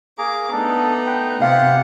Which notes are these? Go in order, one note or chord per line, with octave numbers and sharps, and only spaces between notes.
A#3 G#4 A#5 D6
A3 B3 D4 D#4 A4
B4 G5
C3 F4 G4 F5 F#5